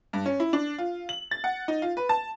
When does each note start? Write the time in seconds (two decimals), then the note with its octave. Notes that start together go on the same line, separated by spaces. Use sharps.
0.13 G2
0.26 C#4
0.40 E4
0.53 D4
0.78 F4
1.09 F#7
1.31 A6
1.44 F#5
1.68 D#4
1.82 F4
1.97 B4
2.09 A5